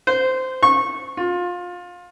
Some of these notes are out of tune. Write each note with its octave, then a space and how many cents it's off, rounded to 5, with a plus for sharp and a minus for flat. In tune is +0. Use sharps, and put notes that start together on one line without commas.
C5 -15
C#6 -20
F4 +25